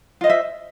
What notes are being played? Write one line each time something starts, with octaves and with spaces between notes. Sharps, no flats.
F4 C5 D#5 E5